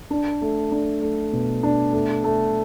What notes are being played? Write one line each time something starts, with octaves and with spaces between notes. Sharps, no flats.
D4
A3
D4
A3
B2
D4
A3
A3